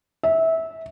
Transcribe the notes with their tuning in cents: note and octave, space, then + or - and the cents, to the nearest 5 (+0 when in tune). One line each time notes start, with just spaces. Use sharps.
E5 -20